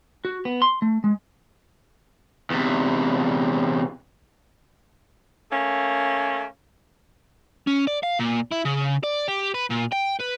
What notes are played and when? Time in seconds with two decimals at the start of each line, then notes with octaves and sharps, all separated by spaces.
0.25 F#4
0.45 B3
0.62 C6
0.82 A3
1.04 G#3
2.50 E2 C3
5.51 A3 A#3 C#4
7.67 C#4
7.87 D5
8.03 F5
8.20 A#2
8.52 E4
8.65 C#3
9.04 D5
9.28 G4
9.55 B4
9.70 A#2
9.93 G5
10.20 B4